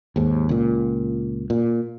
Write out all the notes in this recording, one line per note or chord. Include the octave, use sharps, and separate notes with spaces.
D#2 G#2
C#2 A#2
A#2